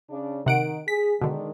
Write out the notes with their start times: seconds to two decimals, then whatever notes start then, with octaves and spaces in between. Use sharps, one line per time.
0.10 C#3 D4
0.46 C3 D#3 F#5 D7
0.88 G#4 B6
1.21 B2 D3 D#3 G#3 D4